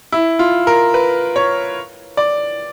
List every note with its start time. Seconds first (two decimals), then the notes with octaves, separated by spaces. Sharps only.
0.12 E4
0.39 F4
0.67 A#4
0.94 B4
1.36 C#5
2.17 D5